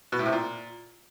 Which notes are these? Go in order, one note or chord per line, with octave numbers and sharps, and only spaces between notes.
B2
A2
C3
A#2